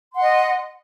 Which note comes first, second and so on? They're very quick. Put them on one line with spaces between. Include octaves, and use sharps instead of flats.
C6 F#5 D#5